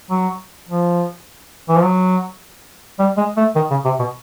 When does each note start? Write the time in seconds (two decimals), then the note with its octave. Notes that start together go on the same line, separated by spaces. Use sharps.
0.11 F#3
0.69 F3
1.69 E3
1.76 F3
1.84 F#3
2.99 G3
3.17 G#3
3.37 A3
3.56 D#3
3.71 C#3
3.85 C3
3.99 B2